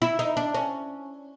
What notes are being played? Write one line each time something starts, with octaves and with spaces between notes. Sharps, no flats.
E4
D#4
D4
C#4